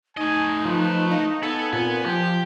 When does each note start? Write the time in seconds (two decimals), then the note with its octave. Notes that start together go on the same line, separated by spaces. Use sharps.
0.17 A3 D#4 D#5 G#5
0.65 F3 B4
1.12 D#4 F5
1.43 B3 D#4 A4 G#5
1.73 A#2 B3 C4
2.05 F3 G4 G5